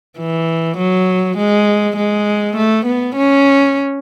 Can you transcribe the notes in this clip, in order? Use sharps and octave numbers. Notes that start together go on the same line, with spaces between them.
E3
F#3
G#3
G#3
A3
B3
C#4